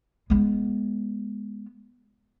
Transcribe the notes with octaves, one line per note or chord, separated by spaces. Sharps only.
G#3 B3